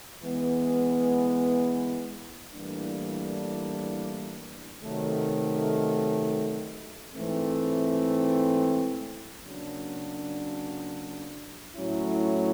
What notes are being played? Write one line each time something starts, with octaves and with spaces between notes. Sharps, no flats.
E3 G#3 B3
A2 E3 G3 A#3 D4
C3 D#3 F#3 A3
G#2 E3 A3 C4
C#3 F#3 A#3 D4
A2 F#3 A3 C#4 E4